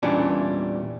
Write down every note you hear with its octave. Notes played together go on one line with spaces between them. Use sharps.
E2 A#2 E3 G3 C#4 D4